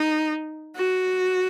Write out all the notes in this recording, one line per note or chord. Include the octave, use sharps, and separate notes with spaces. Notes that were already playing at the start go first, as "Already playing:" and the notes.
Already playing: D#4
F#4